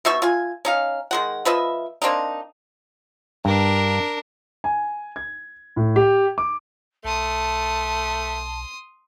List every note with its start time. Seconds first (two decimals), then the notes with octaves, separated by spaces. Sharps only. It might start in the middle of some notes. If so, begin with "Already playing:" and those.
0.05 B2 D#4 E5 C#6
0.22 F4 G#5
0.65 C#4 D#4 F5
1.11 D#3 G#3 F#5
1.45 F3 B4 D#5 E5
2.02 A#3 C4 D4 D#4
3.45 G2 D4 A#4
4.64 G#5
5.16 G#6
5.76 A2
5.96 G4
6.38 D6
7.05 B1 A3 A5 C6 D#6